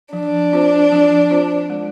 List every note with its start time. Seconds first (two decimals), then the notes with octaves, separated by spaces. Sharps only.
0.13 F3 D4
0.53 C4 F4 C5
0.92 F3
1.30 C4 F4 C5
1.70 G#3